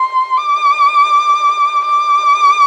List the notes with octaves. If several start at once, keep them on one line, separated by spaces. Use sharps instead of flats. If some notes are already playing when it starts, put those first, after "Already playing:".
Already playing: C6
D6
D6